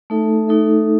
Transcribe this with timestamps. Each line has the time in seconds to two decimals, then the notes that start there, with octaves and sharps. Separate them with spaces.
0.10 A3 D#4 A4 E5
0.48 A3 D#4 A4 E5